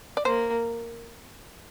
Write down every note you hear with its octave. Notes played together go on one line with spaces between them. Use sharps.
D5
A#3 C5